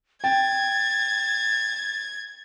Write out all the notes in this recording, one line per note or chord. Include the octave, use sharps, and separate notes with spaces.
G5 G#6 A6